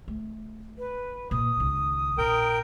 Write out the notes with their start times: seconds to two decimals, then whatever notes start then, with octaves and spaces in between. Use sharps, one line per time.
0.08 A3
0.78 B4
1.31 A#2 D#6
1.57 C#2 D#3
2.18 A#1 A#4 G5